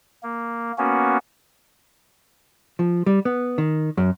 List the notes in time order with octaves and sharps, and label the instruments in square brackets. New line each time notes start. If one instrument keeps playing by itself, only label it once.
[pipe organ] A#3
A#3 B3 C#4 F#4
[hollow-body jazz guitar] F3
G3
B3
D#3
F#2